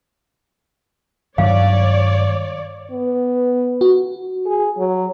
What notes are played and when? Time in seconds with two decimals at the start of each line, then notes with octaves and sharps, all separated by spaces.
1.38 G2 D#3 F#3 C#5 D5 F5
2.91 B3
3.81 F#4
4.47 G#4
4.78 F#3